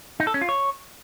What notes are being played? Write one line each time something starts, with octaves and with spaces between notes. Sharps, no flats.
D#4
A4
C#4
F4
C#5